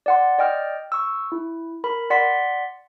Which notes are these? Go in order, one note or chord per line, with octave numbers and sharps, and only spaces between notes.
D5 F#5 C6
D5 D#5 G5 F6
C#6 E6
E4
A#4 B5
D5 F#5 C6 B6